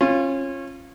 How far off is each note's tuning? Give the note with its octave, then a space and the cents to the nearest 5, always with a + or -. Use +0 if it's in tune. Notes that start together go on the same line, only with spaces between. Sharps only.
C#4 -25 F4 -10